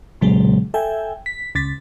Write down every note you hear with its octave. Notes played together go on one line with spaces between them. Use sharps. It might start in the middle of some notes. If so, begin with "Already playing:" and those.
B1 A#2 C#3 F#3 G#3
A4 E5 G5 G#5
B6
C#2 A6 B6